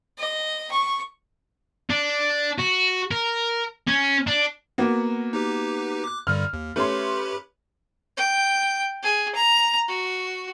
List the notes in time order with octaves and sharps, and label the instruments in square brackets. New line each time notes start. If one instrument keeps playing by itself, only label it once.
[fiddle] D#5
C#6
[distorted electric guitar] D4
F#4
A#4
C#4
D4
[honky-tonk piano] A#3 B3 F#4
[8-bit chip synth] D#4 G4 B4
D6 F#6
[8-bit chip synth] G2 D3 G3 [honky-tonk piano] F6
[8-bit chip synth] D#2
[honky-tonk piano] A3 C#4 C6 [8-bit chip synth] G4 B4 B5
[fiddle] G5
G#4
A#5
F#4